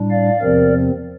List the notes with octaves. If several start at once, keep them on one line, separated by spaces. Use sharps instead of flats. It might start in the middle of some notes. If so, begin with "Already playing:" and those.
Already playing: A2 G3 D4
D5 F5
E2 C3 F3 C4 A#4 D5